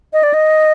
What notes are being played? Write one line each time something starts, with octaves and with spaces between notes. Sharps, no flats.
D#5
D5
D#5